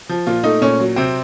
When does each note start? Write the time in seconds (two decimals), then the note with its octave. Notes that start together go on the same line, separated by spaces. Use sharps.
0.09 F3
0.26 A#2 F4
0.43 A3 D#4
0.61 A#2 C#4
0.80 F#3
0.96 C3 C4